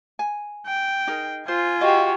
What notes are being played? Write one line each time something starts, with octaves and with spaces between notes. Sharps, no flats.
G#5
G5
D#4 G#4 A#4
F4 C5 G#5
F#4 G4 D#5 F5